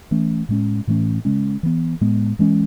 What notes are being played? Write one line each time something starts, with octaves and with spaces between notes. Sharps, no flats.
E3 A3 C#4
A2 G#3 C#4
A2 E3 A3 C#4
C#3 G#3 C#4
E3 B3
A2 G#3 B3
E3 G#3 C#4